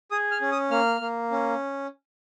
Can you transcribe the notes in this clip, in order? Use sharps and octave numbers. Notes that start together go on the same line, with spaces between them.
G#4 D#6
F6
C#4
D#6
A#3 F6
A#3
C#4